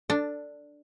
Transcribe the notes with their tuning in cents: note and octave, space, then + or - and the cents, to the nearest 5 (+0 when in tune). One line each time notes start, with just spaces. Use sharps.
D4 +0 A4 +15